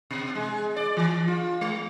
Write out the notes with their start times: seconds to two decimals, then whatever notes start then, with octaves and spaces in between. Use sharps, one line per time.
0.11 B2
0.35 G#3
0.76 D5
0.97 E3
1.28 F4
1.61 G#3